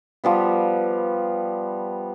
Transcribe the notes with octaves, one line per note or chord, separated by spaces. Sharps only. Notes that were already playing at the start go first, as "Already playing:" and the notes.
F3 G3 B3